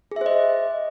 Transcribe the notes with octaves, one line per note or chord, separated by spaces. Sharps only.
G#4 C5 D#5 E5